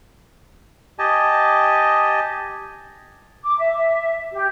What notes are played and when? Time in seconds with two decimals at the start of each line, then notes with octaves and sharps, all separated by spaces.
0.99 G4 D#5 G#5 A5
3.43 D6
3.58 E5
4.32 G4